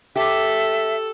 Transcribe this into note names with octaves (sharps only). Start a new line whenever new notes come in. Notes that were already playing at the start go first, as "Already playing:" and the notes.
G4 A4 E5